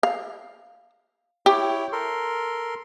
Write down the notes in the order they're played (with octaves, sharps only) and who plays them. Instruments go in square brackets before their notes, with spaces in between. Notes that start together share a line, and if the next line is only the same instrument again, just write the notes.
[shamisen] F5
[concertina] E4 C#5 G5 [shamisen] G4
[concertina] A4 A#4 C6